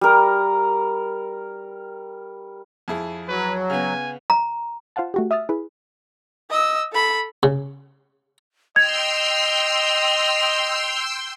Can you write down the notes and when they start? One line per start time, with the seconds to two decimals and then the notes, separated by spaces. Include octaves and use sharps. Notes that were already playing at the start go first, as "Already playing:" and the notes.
0.01 G3 A#4
2.88 F2 E4 G#4
3.28 F#3 B4
3.70 C#3 B3 G#5
4.30 A#5
4.96 F4 C5 F5 F#5 A5
5.14 A3 F#4 G4
5.31 E5 D#6 F6 A6
5.49 E4 G#4 B4
6.50 D#5 E6
6.92 A4 B5
7.43 C#3
8.76 D#5 G5 C6 E6 G#6 F7